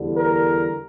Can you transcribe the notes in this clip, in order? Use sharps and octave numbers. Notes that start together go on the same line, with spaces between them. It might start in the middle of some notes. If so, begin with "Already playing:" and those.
Already playing: E2 D3 G3
A#4